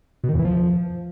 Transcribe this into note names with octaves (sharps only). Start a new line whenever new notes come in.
B2
D#3
E2
E3
F3